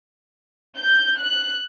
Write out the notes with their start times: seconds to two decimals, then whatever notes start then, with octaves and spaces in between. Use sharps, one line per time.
0.78 G6
1.18 F#6